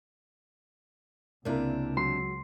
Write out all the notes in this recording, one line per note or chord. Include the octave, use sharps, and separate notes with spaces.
C#2 C3 A#3 D4 E4 A#4
F#3 C6